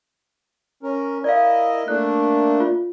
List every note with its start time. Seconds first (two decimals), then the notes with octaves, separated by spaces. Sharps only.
0.83 C#4 A#4
1.24 E4 A#4 D5 D#5 F5
1.88 A3 A#3 D4 F#6
2.60 F4